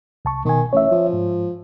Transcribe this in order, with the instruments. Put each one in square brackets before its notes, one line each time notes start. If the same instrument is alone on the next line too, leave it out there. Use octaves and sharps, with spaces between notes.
[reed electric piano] C2 A5 C#6
[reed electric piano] B2 G#5 [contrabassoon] D#3
[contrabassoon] A1 [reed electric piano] C#5 E5
[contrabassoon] F3
[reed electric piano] G#2